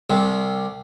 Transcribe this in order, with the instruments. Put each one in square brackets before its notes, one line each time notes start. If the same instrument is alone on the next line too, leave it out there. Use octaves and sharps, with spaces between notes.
[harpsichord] C2 C3